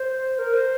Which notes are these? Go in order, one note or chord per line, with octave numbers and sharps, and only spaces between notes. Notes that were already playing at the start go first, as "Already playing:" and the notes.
Already playing: C5
A#4
C5